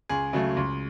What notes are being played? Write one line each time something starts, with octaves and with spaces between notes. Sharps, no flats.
C#2 G#4
C#3 F#3 A3
C#2